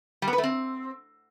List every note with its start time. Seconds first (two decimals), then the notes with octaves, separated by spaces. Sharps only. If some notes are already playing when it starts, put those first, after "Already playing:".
0.22 G3
0.28 B3
0.33 B4
0.38 A3
0.44 C4